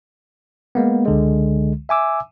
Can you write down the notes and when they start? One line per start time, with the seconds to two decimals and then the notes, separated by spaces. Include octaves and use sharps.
0.75 G#3 A#3 B3
1.06 C#2 D3 G#3
1.89 E5 G#5 D6 E6